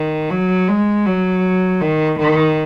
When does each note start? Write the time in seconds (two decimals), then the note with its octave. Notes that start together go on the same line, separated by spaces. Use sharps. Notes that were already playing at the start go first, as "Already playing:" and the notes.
Already playing: D#3
0.30 F#3
0.68 G#3
1.05 F#3
1.81 D#3
2.19 D#3